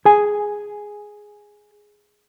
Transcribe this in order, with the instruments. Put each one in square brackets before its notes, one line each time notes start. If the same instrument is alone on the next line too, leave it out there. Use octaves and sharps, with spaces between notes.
[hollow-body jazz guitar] G#4 G#5